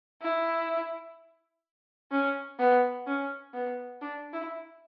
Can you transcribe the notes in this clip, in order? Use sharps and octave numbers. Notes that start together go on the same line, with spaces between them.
E4
C#4
B3
C#4
B3
D4
E4